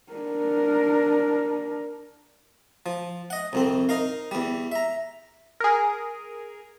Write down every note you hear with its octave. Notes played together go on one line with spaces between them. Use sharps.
D4 A#4
F3
D#5 F#5
C2 F2 C4
D#4 A#4 F5
E2 G3
E5 A#5
G#4 A#4